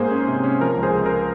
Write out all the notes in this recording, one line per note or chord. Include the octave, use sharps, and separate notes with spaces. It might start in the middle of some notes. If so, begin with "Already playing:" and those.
Already playing: G#2 A#3 G#4 C5
C#4
C3
C#4
F3 A#4
C#2
G#4 C5
C#2
A#4